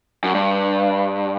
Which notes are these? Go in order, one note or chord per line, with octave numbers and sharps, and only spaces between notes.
F#2
G2